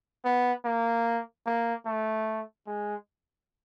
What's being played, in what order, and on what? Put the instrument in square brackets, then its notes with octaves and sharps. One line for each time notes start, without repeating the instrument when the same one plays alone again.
[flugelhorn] B3
A#3
A#3
A3
G#3